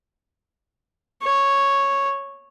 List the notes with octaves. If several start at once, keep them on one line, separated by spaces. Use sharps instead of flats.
C#5